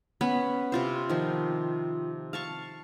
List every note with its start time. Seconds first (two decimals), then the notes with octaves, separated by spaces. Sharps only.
0.21 B3 C#4 B5
0.72 C3 F4 C5
1.09 D#3 F3
2.33 F5 A5 C#6